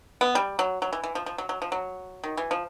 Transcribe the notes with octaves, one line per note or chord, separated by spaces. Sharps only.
B3
G3
F#3
F#3
E3
E3
F3
F3
F#3
F#3
F3
F#3
D#3
E3
F3